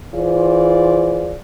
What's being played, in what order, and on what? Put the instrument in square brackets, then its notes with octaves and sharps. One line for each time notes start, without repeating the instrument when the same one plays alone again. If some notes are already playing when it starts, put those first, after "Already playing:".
[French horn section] E3 F4 G#4 C5 D5